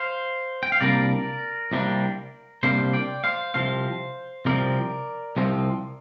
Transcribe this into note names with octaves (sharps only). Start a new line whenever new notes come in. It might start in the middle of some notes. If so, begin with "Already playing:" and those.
Already playing: C5 F5
G5
F5
C2 C3 G3 A#3 D4 A#4 D5
C2 C3 G3 A#3 D4
C2 C3 G3 A#3 D4 C5 F5
D5 G5
C5 F5
C2 C3 F3 C4 C5 F5
C2 C3 F3 C4 A#4 D5
C2 C3 F3 C4